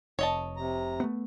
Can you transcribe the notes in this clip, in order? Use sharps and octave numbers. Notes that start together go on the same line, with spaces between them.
F1 C#5 D#5 A5
C3 A#5
A3 B3